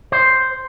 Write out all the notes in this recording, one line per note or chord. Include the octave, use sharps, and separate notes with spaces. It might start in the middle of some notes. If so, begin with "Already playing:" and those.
C5